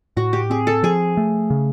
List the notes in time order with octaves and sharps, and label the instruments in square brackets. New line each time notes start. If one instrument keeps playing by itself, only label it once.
[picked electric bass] A2 [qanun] F#4
[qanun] G4
[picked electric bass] C4 [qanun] G#4
[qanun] A4
[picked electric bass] F3 [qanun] G#4
[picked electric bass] A3
C#3